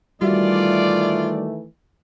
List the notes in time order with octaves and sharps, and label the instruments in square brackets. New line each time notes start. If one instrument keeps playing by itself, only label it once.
[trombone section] D#3 E3 A3 [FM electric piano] G3 F#4 E5 [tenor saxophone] F4 [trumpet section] D5